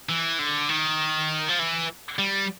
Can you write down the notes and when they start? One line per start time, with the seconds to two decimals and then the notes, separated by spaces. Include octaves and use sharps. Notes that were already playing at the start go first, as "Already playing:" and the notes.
0.09 E3
0.39 D3
0.69 D#3
1.48 F3
1.59 E3
2.19 G3